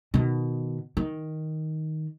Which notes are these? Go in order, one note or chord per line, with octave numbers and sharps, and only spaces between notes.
B2 D#3
D#3